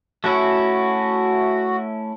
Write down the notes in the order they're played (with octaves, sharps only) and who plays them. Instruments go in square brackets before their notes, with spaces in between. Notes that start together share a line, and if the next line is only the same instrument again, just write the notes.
[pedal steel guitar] A3 C#4 E4 [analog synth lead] F#4